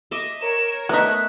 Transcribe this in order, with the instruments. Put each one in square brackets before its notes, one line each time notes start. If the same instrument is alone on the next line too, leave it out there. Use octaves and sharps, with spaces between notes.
[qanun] D#5 E5 D6
[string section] A#4 C#5 [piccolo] E7
[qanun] A3 E5 [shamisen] B3 D#4 [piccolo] F#6